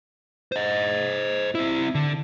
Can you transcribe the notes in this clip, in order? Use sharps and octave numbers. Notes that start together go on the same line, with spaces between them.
C5 D#5
C4 E4
D3